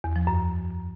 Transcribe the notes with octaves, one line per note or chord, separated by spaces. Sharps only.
E2
F3
F#2